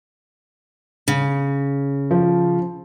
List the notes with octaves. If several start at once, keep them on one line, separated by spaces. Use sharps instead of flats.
C#3
F3